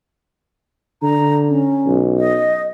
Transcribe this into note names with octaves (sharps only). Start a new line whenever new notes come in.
D3 A#5
C#4
B1
D#5